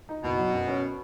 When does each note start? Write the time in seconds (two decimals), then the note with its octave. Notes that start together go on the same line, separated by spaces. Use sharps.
0.09 D#4
0.23 F#1 B2
0.38 F#3
0.54 F#2
0.68 C#4